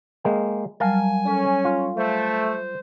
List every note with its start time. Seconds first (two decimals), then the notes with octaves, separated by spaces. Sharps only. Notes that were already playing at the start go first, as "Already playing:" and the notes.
0.24 G#3 A#3 G5
0.80 F#3 G3 A#4 F5 G#5 A5
1.26 C#4 A4
1.65 F4
1.96 A3 C5